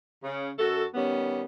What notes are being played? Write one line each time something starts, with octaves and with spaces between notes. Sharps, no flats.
C#3
F#2 F#4 A4
D#3 G3 B3 C#4